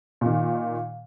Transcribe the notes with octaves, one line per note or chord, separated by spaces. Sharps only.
A#2 D#3